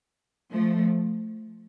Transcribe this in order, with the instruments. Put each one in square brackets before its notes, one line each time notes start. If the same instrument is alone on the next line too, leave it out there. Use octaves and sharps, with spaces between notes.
[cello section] F3 A3